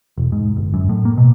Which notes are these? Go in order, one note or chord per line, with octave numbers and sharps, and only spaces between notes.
E1
G#2
G1
F#2
A2
A#3
B2